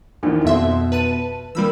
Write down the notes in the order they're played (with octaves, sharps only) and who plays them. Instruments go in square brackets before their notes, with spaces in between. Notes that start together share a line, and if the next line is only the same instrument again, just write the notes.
[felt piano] A#1 E2 D#3
[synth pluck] F2 E5 C6 [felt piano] B2
[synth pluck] B4 A5 D#7
[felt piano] F3 A#3 [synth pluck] G3 B5 E6